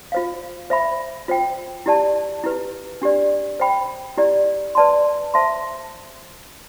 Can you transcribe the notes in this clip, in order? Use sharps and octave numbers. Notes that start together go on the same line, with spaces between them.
F4 C5 F5
C5 E5 B5
F4 C5 G5
E4 G4 D5 A5
E4 G4 B4
D4 G4 D5
C5 G5 B5
E4 G4 D5
B4 D5 A5 C6
C5 E5 A5 C6